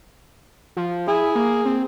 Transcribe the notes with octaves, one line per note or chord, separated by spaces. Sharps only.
F3
E4 G#4
A#3
C4